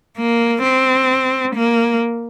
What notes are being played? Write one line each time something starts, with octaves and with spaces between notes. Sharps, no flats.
A#3
C4
A#3